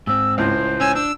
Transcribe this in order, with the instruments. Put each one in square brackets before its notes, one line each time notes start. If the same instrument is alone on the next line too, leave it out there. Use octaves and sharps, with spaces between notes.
[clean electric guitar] G#2 C4 [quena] E6
[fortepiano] C#2 A2 [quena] C5
[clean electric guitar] C#4 [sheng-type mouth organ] G#5 E6
[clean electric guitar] D4 [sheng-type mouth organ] E6